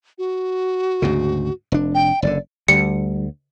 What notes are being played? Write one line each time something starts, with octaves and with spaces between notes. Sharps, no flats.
F#4
D2 G#2 C#3
F1 D4
G5
F#1 A2 D3 D5
D2 D3 G3 C#7